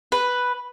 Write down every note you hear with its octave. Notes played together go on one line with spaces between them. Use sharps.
B4